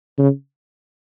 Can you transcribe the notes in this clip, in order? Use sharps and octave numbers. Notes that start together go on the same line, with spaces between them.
C#3